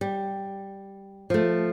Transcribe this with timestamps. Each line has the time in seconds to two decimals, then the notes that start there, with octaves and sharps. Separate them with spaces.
0.01 G3
1.30 F3 A3